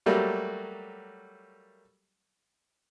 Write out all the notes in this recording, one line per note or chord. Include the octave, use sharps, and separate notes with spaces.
F#3 G3 A3 A#3